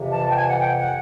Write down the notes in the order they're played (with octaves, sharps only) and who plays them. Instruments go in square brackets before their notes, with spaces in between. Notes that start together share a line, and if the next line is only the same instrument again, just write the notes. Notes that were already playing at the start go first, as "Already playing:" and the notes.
Already playing: [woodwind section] F2 C3 E3
A5
G5
G#5
F#5
G5
F#5